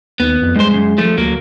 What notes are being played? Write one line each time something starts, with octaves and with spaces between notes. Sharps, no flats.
D#2 B3
F2
G2 G#3 C5
B1 F#2
F3 A3
D2 F#3 A#3